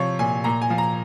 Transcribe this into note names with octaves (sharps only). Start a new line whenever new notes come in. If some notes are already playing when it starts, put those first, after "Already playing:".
Already playing: C3 F3 C#5
A#2 G#5
A#2 A#5
G#5
F3
A#5